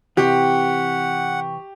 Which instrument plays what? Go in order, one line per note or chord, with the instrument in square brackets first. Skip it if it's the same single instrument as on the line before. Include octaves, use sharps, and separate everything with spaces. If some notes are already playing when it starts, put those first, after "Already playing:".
[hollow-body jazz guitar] C3 E3 [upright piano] G4 [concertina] F#5 [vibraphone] G5 C#6